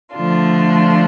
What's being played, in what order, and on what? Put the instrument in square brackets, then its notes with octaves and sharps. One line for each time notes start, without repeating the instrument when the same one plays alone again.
[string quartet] D3 F3 A3 D4 F4